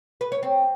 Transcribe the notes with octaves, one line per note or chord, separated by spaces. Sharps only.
B4
C#5
C4